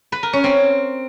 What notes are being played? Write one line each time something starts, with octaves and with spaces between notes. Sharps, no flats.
B4
A#4
C#4
C4